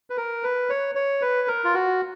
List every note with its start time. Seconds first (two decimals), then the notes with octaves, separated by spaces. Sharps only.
0.10 B4
0.17 A#4
0.43 B4
0.70 C#5
0.95 C#5
1.21 B4
1.48 A#4
1.64 F4
1.74 F#4